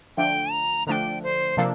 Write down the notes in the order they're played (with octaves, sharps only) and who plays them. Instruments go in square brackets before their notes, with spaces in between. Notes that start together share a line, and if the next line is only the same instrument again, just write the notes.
[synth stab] D3 F3 A3 D4 [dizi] G5
[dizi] A#5
[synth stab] D3 F3 A3 D4 [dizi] G5 A#5
[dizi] C5
[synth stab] C3 F3 A#3 D4 A4 [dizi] C5